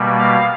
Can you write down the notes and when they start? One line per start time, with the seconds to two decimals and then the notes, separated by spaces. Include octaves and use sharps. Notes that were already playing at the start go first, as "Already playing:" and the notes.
Already playing: B2 G3 A#3
0.18 F5